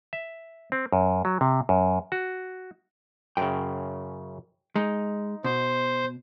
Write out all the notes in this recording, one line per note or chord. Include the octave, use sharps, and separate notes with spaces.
E5
C4
F#2
F#3
C3
F#2
F#4
F#2 C#3 G5
G#3 D#4
B2 C5